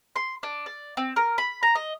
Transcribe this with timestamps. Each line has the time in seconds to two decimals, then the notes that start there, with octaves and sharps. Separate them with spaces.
0.16 C6
0.43 D4
0.66 D5
0.97 C4
1.16 A#4
1.38 B5
1.63 A#5
1.75 D#5